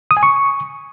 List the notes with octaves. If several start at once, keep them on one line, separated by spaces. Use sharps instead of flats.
D#6
G#5
C#6